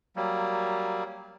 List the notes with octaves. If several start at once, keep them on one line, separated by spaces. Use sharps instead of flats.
F#3 G3 A#3